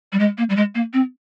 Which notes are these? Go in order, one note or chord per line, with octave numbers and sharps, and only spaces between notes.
G3
G#3
A#3
G3
G#3
A#3
C4